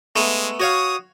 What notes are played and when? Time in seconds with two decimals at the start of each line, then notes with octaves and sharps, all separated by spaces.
0.16 G#3 A3 B3
0.60 F#4 C#5 F5 D#6